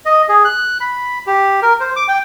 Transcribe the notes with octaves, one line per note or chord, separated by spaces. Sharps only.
D#5
G#4
F#6
B5
G4
A#4
C5
D6
G5